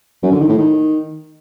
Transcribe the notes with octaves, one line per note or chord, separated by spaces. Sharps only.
F#2
D3
D#3
A2
D#3